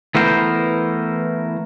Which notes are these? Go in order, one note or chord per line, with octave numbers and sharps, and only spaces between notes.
E3 A3 B3 A#4 C5